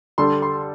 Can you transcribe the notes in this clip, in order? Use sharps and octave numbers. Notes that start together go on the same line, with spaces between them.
D3 G3 D4 A4 C6
C6